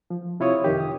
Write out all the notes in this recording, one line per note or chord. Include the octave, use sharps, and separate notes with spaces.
F3
C3 E4 F4 C#5 D#6
F2 D#3 G4
D#6